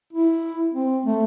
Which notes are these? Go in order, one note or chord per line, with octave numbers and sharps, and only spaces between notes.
E4
C4
A3